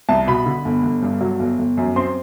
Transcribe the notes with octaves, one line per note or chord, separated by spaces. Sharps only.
C2 A5
B2 B5
D3
G1
G1
G2
F#3
G1
G1
F#2
C4 C6